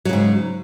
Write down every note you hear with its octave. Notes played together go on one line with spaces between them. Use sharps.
G#2 C#3 F#3